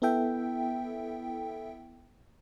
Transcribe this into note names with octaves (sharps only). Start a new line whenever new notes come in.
B3 E4 A4 E5 G5